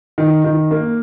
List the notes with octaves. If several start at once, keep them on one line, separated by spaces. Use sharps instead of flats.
D#3
D#3
A#3